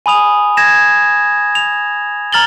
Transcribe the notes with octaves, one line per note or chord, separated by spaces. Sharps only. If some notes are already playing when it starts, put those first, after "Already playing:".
G#5 B5 D#6 F7
G#6 A#6 E7
F7
A#5 F6 A6 F#7 G7